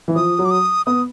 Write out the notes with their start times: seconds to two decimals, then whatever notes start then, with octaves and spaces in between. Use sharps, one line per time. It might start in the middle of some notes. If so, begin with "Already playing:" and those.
0.08 E3
0.16 F3 D#6
0.39 F#3
0.45 D6
0.51 D#6
0.86 B3 D#6